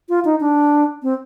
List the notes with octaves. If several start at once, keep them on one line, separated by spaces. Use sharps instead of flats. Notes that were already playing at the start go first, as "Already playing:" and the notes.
F4
D#4
D4
C4